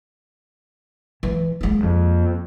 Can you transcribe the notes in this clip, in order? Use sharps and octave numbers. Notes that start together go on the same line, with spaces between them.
E3
G#3 A#3
F2